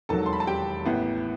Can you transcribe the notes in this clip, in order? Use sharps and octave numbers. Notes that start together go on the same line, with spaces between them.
E1 D#2 D#3 F#3 A4 A5
C6
B5
A5
G4 G5
A1 A2 E3 B3